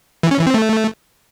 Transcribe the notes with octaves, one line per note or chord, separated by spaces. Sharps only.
E3
C#4
E3
C4
A3